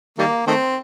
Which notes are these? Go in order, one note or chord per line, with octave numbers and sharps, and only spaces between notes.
D#3 G3 A#3
D#3 A3 C4